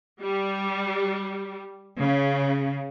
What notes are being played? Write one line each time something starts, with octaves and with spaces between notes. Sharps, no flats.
G3
C#3